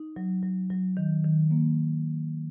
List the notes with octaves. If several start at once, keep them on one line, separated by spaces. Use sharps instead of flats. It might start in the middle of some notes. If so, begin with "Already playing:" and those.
Already playing: D#4
F#3
F#3
F#3
D#3
D#3
A#3